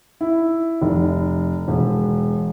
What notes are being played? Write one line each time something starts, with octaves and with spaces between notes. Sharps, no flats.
E4
F1
E1